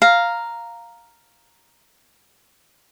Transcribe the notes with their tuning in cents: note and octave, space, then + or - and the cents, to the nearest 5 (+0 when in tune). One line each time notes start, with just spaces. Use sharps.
F5 +0 A#5 +0